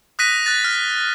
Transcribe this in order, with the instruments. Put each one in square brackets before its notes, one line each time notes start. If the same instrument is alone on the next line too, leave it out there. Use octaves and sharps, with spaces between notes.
[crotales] D#6 F#6 A#6 B6 D#7
F#6 A6
F6